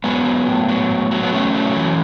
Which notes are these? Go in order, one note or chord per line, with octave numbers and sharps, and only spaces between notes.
F#3 G#3 B3
F#3
A2
F#3
A2
F#3
B3
A2 A3 C#4
F#3
E3